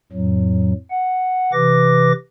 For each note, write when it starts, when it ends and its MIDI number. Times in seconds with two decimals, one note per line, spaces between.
0.12 0.73 41
0.12 0.73 45
0.12 0.73 54
0.91 1.52 78
1.53 2.12 48
1.53 2.12 52
1.53 2.12 71
1.53 2.12 86
1.53 2.12 94